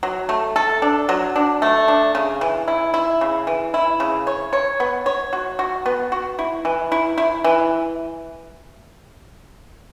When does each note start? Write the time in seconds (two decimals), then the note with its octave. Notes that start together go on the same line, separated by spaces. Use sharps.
0.03 F#3
0.29 A3
0.56 A4
0.82 D4
1.09 F#3
1.36 D4
1.62 A3
1.88 D4
2.15 C#3
2.41 E3
2.68 E4
2.94 E4
3.21 C#3
3.47 E3
3.74 E4
4.00 C#3
4.27 C#5
4.53 C#5
4.80 B3
5.06 C#5
5.33 F#4
5.59 F#4
5.86 B3
6.12 F#4
6.39 E4
6.65 E3
6.92 E4
7.18 E4
7.44 E3